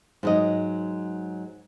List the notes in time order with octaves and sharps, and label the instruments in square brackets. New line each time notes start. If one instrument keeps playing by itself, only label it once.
[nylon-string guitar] G#2 F#3 D#5